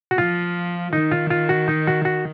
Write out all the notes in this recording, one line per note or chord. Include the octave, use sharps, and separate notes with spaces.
F#4
F3 F4
D#3 D#4
F4
F4
F#4
D#4
F#4
F#4